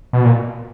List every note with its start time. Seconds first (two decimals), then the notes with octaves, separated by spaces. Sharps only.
0.13 B2
0.25 A#2